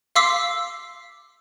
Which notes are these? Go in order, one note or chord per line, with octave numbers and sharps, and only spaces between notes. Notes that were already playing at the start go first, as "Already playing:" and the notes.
F5 C6 D6 E6 B6 C7